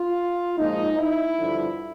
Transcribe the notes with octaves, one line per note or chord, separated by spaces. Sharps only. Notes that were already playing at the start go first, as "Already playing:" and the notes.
Already playing: F4
A#2 F3 G#3 D#4
E4
G2 D3 F3